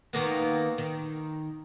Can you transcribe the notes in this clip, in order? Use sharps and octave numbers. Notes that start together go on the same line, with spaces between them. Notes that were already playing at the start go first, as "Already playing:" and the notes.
D#3 A#3 B3
D#3